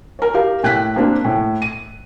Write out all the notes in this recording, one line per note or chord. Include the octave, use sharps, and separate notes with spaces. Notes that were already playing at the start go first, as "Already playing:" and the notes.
A#4 C#5
G4 A#4 F5
A2 G5 F#6 B6
A#3 C4 D4
A2
D#7